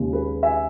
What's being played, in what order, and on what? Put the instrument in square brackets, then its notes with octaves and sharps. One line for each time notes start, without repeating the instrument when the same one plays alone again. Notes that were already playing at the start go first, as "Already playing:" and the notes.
Already playing: [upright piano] D#2 C#3 G#3
G#4 B4
E5 G#5